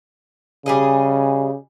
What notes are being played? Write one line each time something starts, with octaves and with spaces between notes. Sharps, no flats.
C#3 G3 G#4 D#5